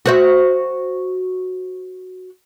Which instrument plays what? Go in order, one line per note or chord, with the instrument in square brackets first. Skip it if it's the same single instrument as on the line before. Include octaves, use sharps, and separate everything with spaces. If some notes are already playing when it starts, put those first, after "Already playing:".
[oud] F#4 C5 E5